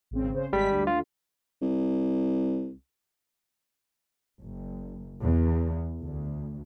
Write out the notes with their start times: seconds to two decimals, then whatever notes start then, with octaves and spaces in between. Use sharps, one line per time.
0.11 G#1 C#3 C4
0.34 C#3 C5
0.53 G#1 G3 G#3 B6
0.72 D2 D3
0.87 F4
1.62 C2
4.40 F#1
5.22 E2
6.02 D2